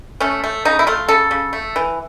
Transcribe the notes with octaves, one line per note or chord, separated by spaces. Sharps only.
A3 C#4
A3
C#3 D#4
E4
A3 F4
C#3 A4
C#3
A3
E3